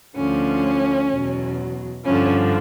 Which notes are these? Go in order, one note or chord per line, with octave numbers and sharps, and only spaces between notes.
D2 D3 F3 C#4
E2 B2 F#3
G2 D3 F3 C#4